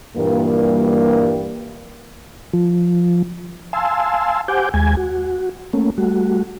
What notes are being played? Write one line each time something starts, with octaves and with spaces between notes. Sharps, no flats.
G2 A#2 E3 G3 A#3
F3
F5 G#5 A5 C6 E6
G4 C5 F#5 G#5 D6 G6
D#2 G#3 G#5 G#6
F#4
A3 A#3 C#4
G3 A3 F#4